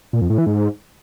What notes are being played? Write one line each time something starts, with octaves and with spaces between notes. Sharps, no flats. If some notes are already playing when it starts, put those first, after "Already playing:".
A#2
F2
A2
E3
G#2